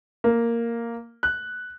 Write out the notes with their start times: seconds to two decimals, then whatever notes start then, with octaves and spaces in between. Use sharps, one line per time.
0.24 A#3
1.23 F#6